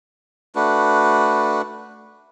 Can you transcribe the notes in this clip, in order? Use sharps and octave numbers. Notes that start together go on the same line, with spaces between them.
A3 D4 F#4 B4